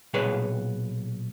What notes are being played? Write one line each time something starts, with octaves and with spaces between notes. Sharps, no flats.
B1 A#2 G#4 B4 C#5